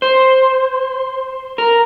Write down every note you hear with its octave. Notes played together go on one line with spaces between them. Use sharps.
C5
A#4